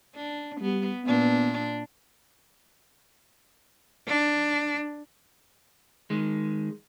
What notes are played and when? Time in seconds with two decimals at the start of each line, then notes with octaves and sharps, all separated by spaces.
0.16 D4
0.61 G3 B3
1.05 A#2 B3 D4
4.08 D4
6.10 D#3 G#3